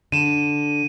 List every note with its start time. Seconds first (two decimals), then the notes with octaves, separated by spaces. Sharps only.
0.12 D3 D#7 E7